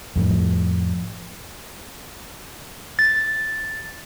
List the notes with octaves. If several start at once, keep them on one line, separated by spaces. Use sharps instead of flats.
F2 A2 F3
A6